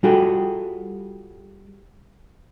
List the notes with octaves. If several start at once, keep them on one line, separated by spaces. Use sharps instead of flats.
G3 F4 F#4 G#4 A4 G5